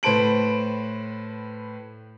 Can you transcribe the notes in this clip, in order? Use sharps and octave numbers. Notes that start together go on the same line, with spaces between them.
A2 B4 C5 A5 D7 F#7